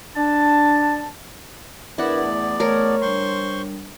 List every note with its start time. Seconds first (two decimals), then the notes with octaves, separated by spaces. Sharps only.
0.16 D4 A5
1.98 E2 B3 D4 E4 A#4 B4 D5 F#5
2.23 A3
2.60 A3 A#4 C#5
3.02 G3 D4 C5 C6 C#6